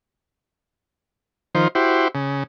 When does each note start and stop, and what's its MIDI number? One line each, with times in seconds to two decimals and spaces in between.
1.55 1.68 51
1.55 1.68 53
1.55 1.68 72
1.75 2.08 64
1.75 2.08 66
1.75 2.08 67
1.75 2.08 72
2.15 2.43 49